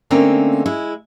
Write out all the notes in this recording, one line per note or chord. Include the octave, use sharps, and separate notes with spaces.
D3 A3 A#3 C4 C#4 D#4
G#3 E4